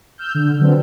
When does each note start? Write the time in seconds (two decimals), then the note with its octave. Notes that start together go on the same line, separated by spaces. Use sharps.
0.18 E6 F6 G6
0.35 D3
0.59 D3 F#3 B3 C4 D4